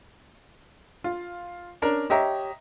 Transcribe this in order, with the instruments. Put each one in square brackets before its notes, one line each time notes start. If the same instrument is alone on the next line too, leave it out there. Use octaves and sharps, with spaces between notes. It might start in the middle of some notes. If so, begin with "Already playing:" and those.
[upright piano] F4
C#4 D4 A#4
[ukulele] G4 C#5 G5 [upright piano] D#5 E5 A#5